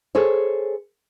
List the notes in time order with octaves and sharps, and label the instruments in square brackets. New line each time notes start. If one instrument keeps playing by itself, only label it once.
[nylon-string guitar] G#4 A4 C5 C#5